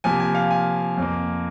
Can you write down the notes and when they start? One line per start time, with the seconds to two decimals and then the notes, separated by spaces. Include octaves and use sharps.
0.04 C3 F3 A#3 G#5
0.20 G#5
0.35 F5
0.51 G#5
0.98 F2 F3 A#3